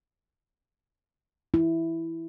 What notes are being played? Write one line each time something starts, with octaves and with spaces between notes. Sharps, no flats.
E4